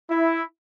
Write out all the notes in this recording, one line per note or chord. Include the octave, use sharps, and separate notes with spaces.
E4